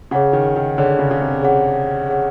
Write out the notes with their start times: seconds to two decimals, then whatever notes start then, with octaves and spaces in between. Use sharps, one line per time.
0.11 C#3 G#4 C#5 F#5
0.33 D#3
0.56 D#3
0.77 D3 G#4 C#5 F#5
0.99 C#3
1.11 C#3
1.21 C3
1.43 G#4 C#5 F#5
2.09 G#4 C#5 F#5